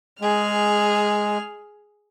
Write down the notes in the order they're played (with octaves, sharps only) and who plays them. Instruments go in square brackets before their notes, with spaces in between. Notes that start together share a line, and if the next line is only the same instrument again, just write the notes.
[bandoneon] G#3 [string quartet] G#4 F6